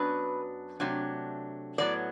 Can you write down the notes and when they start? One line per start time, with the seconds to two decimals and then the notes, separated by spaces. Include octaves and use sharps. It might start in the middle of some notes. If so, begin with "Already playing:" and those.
Already playing: F#2 F#3 B3 D4 B4
0.80 C3 F#3 A3 D4
1.78 A2 F#3 B3 D5